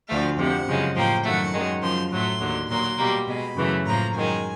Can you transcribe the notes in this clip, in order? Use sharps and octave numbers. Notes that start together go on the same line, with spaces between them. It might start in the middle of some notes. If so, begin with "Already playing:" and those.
D2 D3 F3 A3 F5
F2 C3 F3 F#5
F#2 C#3 F3 G#3
A2 F3 A#3 G5
F#2 D#3 F#3 A3 F#5
F#2 D#3 G#3
F#2 C#3 F3 C6
A2 F#3 A3 C6
D#2 D3 F#3
A#2 F#3 A#3 C6
B2 G3 A#3
B2 G#3 B5
F#2 C#3 E3 A3
A2 F3 A#3 A#5
F#2 D#3 G#3 G#5